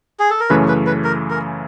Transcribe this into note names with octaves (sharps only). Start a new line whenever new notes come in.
G#4
A4
A#4
F#2 C#3 E3 A3 C#4 B4
B4
B4
A#4
A#4